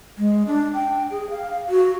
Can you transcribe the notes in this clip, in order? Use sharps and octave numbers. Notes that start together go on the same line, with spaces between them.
G#3
D4
G5
G#4
F5
F#4